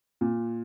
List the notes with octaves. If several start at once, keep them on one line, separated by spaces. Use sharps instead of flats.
A#2